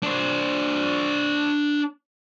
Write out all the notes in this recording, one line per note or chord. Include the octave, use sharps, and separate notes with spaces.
D4 C5